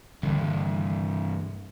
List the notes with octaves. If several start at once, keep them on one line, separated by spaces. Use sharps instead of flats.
C2 G2 D3 D#3 G3